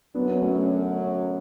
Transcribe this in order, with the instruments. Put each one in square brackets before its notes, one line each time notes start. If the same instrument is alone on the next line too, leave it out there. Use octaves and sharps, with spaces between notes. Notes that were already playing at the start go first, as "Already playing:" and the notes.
[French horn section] F#2 D3 F#3 [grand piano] B3 D4
[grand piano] A3 C#4